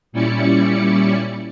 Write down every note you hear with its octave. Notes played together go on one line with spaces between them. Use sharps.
A#2 G3 C#4 E4 D5 C#7